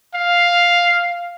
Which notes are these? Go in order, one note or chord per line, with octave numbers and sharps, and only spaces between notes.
F5